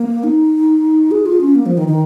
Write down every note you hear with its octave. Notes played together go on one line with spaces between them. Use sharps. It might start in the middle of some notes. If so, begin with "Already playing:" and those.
Already playing: A#3
D#4
G#4
F4
C#4
A#3
F3
D#3
D#3